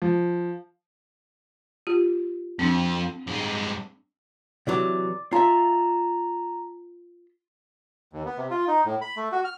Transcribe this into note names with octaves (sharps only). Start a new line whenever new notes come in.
F3
F4 G4
F2 C4 D4
G2 G#3
C3 E3 F#3 D5 D6
F4 E5 A5 A#5
D#2
B3
C3
F4
D#4
A2
B5
A3
F#4
F6